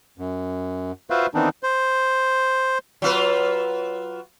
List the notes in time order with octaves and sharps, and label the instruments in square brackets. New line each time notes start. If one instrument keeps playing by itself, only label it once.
[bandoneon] F#2
F4 F#4 B4 C5 E5 F5
D#3 E3 B3 C4 D4 D#4
C5
[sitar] F#3 F4 B4